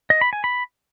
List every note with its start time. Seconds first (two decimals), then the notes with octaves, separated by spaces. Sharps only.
0.10 D#5
0.21 B5
0.33 G#5
0.44 B5